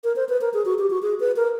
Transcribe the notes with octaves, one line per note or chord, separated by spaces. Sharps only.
A#4
C5
B4
A#4
G#4
F#4
G4
F#4
G#4
B4
A#4